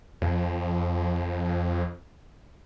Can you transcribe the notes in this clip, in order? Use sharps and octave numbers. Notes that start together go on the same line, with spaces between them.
F2